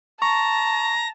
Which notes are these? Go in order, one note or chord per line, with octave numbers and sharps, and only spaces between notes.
A5 A#5 C#6 A#6